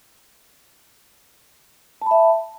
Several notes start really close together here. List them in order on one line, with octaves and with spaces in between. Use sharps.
A5 B5 E5